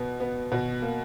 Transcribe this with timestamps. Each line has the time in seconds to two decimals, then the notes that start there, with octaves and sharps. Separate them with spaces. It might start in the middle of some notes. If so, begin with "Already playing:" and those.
Already playing: B2 B3
0.20 B3
0.52 B2
0.82 A#3